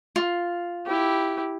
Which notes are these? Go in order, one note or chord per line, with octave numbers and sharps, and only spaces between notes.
F4
E4 G4